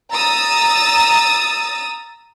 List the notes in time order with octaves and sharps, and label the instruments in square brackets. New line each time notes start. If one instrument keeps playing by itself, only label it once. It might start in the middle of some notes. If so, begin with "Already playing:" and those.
[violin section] A#5 D#6 E6 A6